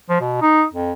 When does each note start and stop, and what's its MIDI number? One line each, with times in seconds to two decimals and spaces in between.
0.09 0.20 53
0.21 0.37 47
0.42 0.64 63
0.73 0.92 41